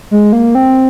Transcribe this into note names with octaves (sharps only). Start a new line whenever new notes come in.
G#3
A#3
C4